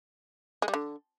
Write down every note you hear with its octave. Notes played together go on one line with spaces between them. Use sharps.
G#3
G3
D3